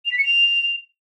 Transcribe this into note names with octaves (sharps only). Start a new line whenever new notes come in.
F7
B6
C#7
F7